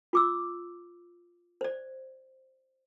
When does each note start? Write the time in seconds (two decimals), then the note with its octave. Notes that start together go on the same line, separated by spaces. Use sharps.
0.13 F4 D6 E6
1.61 C5 D5